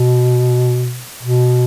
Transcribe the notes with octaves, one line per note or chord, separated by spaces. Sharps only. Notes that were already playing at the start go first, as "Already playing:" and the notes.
Already playing: B2
B2